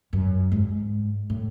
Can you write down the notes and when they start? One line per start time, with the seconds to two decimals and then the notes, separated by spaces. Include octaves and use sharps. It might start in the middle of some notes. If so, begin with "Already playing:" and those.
0.13 F#2
0.52 G#2
1.30 A2